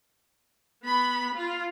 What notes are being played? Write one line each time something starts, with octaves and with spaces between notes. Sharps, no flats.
B3 B5
F4